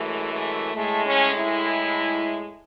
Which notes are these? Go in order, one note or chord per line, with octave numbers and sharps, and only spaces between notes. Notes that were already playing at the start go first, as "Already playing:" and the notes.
Already playing: F#2 E3 G#3 A3
A3
A2 G#3 A3
C#4
E4